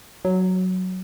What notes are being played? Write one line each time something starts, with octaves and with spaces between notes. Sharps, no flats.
F#3